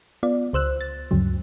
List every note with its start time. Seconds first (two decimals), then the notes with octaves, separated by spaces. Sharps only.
0.23 B3 F4 D5
0.53 C#2 C5 E6 F#6
0.81 A6
1.11 D2 G2 C#3 F#3